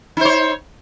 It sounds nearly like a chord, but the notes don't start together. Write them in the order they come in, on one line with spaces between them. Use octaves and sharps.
D#4 C5 C#5